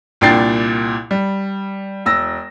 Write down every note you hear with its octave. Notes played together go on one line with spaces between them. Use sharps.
C2 A#2 D4 G5 A6 C7
G3
E1 E6 A#6